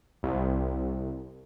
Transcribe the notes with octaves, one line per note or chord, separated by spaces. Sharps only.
C2